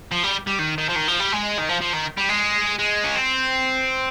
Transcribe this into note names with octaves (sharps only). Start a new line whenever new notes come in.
F3
G3
G3
D#3
D#3
F3
D#3
F3
G3
G#3
D#3
F3
F3
D#3
G3
G#3
G#3
C#4
C4